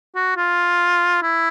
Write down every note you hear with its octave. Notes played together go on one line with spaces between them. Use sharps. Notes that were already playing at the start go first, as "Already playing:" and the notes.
F#4
F4
E4